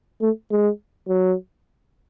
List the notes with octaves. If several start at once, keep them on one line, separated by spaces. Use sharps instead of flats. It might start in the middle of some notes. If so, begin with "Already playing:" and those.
A3
G#3
F#3